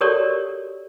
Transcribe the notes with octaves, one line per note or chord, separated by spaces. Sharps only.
F#4 G4 A4 A#4 C#5 D5